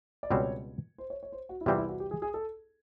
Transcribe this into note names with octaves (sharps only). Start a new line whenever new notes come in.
D5
C#2 B2 G3 C4 C#5
C5
C#5
C#5
C5
F#4
E4
E2 C3 E3 G3 C4 F4
E4
F#4
G4
G#4
G#4
A4